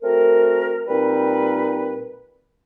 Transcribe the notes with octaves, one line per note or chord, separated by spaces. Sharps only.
A3 C4 F#4 A#4
A#2 G3 C4 D#4 A#4 B4